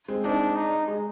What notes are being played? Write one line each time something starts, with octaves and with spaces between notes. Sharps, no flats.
G#3 C4
C4 D4 D#4
D#4
G#3